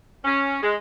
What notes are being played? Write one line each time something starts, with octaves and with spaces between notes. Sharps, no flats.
C#4
G#3